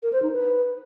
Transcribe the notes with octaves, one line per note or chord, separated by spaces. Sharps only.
A#4
C5
D#4
B4